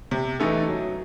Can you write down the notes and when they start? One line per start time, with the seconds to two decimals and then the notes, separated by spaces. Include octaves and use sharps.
0.11 C3
0.40 E3 A3 D#4 A4
0.68 F#3